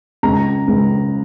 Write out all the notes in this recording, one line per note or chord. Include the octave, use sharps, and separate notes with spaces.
C#2 A#5
C#2